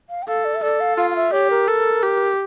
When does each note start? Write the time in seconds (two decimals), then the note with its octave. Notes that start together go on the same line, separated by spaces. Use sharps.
0.10 F5
0.22 G5
0.27 A4 F5
0.45 D5
0.55 E5
0.62 A4 D5
0.80 F5
0.98 F4 F5
1.11 F5
1.16 E5
1.32 G4 C#5
1.50 A#4
1.68 A4
2.03 G4